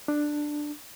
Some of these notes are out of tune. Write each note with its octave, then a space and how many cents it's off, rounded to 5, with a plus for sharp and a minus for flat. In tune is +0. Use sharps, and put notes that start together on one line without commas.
D4 +10